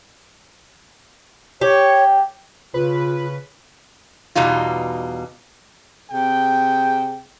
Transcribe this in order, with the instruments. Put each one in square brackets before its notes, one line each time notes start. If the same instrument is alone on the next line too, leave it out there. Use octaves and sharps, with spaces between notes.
[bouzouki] G4 [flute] C#5
[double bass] C#3 [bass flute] F4 [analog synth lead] B4
[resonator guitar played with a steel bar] E2 B2 G3 D#4 F4
[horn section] C3 G#4 G5